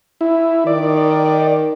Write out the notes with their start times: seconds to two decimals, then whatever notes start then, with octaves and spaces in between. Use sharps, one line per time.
0.21 E4
0.67 D#3 D5